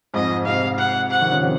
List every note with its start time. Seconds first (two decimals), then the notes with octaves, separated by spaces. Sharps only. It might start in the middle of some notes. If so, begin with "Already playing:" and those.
0.14 F2 G#2 D#5
0.45 G#2 C3 F5
0.78 F#5
1.11 F#5
1.21 C3 D#3
1.32 C#3 F3
1.43 C3 D#3